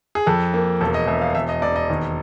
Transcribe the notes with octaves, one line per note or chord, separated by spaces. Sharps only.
G#4
F2 A4
A#3
E1 A4
D#5
E1 E5
F5
E1 E5
D#5
E1 D5
D#5
D#2